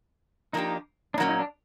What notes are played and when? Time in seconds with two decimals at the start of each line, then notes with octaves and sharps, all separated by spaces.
0.53 F3 A#3 D4 D#4 G4
1.14 D4
1.18 A#2 F#3 A#3 C#4 D#4
1.29 D#4
1.39 D4